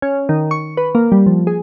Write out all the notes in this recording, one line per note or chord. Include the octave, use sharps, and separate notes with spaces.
C#4
D#3
C#6
B4
A#3
G3
F3
G#4